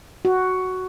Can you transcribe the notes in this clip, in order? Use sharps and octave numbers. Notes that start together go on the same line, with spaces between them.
F#4